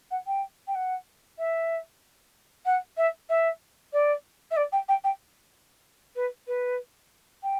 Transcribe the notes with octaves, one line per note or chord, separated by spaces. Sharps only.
F#5
G5
G5
F#5
E5
F#5
E5
E5
D5
E5
D5
G5
G5
G5
B4
B4
G5